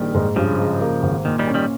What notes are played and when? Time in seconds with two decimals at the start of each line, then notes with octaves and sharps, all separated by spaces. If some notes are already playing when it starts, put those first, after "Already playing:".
Already playing: A#1 D#3 G3
0.14 G#2
0.36 G2 C#3 F3
0.59 G#3
0.81 A#3
1.03 G#1
1.25 A#2 D#3
1.39 D#3 G3
1.48 C#4
1.54 D#3 G3